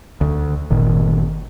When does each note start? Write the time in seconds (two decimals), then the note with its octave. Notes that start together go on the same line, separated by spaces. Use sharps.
0.21 D2
0.71 G1 A#2 D#3